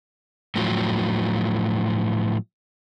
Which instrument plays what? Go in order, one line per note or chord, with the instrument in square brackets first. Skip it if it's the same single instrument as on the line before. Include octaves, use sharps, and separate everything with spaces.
[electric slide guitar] A2 F3 F#3